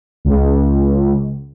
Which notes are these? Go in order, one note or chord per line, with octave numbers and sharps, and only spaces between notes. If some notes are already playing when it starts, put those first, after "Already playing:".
C#2